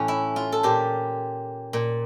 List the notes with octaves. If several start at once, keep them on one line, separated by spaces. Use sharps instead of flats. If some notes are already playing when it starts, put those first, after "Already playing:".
Already playing: A2 E3 C#4 G4 A4
E4
F4
A4
A#2 G4
A#2